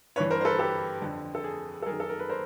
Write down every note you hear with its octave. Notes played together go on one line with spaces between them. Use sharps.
G2 E3 B4 C#5
A#4 C5
C5
A4 B4
G4 A4
F2 D3
A4
G#4
A4
F#2 D#3 G#4 A#4
A4
A#4
B4
A#4 C5